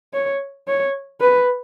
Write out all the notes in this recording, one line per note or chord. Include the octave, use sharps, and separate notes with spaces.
C#5
C#5
B4